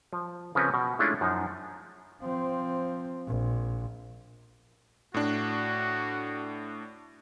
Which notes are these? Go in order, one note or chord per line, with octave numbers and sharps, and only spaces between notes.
F3
C#3 F3 C4 C#4 A#4 B4
B2
G#3 A3 C#4 D4 E4 F4
F#2 F3 D#4
F3 C4
A#1
A2 D4 F#4